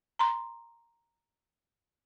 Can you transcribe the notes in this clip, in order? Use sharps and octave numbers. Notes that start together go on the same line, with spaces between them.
A#5 C6